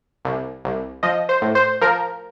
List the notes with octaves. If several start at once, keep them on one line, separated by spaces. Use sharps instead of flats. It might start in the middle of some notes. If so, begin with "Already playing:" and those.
C2
C2
F3 D#5
C5
A2
C5
F3 A#4